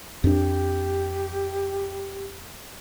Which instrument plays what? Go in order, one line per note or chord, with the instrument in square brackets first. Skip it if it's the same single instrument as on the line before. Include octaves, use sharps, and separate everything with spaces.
[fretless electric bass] F2 D4 [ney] G4